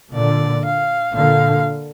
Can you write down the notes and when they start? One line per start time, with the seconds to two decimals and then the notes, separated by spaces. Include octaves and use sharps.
0.14 A#2 D3 D5
0.65 F5
1.15 A#2 D3 F5